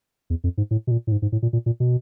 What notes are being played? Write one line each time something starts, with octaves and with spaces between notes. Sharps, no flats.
E2
F2
G#2
A2
B2
A#2
A2
G#2
G#2
A2
A#2
A#2
A#2
B2